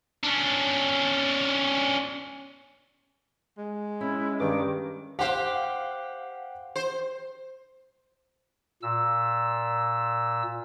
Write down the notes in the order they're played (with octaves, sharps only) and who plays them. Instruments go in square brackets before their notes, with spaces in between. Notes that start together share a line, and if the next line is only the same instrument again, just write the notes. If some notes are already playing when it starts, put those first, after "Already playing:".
[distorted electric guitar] C#4 D4
[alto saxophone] G#3
[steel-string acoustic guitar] C#4 [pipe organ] E4
[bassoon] G2 [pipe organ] D#3 D6
[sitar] G4 C5 [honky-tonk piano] F5 F#5
[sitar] C5
[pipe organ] A#2 E6